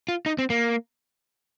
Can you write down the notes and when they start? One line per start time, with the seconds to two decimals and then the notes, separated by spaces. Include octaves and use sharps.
0.08 F4
0.26 D#4
0.38 C4
0.50 A#3